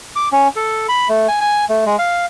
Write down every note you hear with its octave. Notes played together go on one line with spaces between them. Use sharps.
D6
C#4
A4
B5
A3
G#5
G#5
A3
G#3
F5